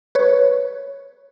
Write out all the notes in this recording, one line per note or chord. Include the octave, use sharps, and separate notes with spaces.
B4 C#5